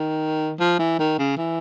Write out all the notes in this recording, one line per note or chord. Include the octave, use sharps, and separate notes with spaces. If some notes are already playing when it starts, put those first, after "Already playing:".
Already playing: D#3
F3
E3
D#3
C#3
E3